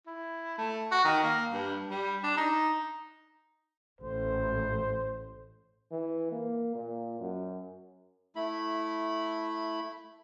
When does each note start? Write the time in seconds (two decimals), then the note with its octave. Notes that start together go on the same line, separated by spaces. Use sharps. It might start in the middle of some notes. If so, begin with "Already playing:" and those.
0.06 E4
0.58 A3
0.91 F#4
1.04 D#3
1.23 A#3
1.50 G2
1.90 G3
2.23 D4
2.37 D#4
4.01 A1 C5
5.91 E3
6.32 A#3
6.75 A#2
7.20 F#2
8.36 A3 E4 B5